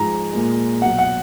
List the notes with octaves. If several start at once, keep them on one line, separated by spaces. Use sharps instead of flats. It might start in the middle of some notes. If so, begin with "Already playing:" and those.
Already playing: G#2 F3 G#3 A#5
A#2 G#3
B2 F#3 F#5
F#5